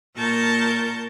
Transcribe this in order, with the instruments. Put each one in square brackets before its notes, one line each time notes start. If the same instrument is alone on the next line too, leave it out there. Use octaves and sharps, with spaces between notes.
[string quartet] A#2 A#4 A5 C#6 G6